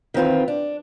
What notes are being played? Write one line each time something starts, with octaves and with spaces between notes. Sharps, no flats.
D#3 E3 C4 F4 B4
D4